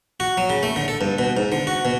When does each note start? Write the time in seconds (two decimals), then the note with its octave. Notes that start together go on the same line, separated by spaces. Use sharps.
0.20 F#4
0.37 F#3
0.50 C#3
0.63 A3
0.76 D3
0.88 A4
1.01 G2
1.19 B2
1.37 G#2
1.52 D3
1.67 F#4
1.85 B2